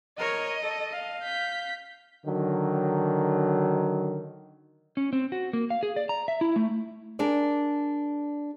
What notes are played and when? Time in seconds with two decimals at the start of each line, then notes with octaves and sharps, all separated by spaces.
0.18 A#4 C#5 D#5
0.62 A4
0.91 F5
1.23 G6 B6
2.26 D3 D#3 F#3
4.97 C#4
5.13 C4
5.32 F#4
5.53 A#3
5.70 F5
5.83 G#4
5.96 D5
6.09 A#5
6.28 E5
6.41 E4
6.56 A3
7.19 D4 G#4 A#4 D5